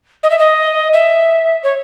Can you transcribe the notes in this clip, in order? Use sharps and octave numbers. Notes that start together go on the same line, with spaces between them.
D#5
E5
D#5
E5
C#5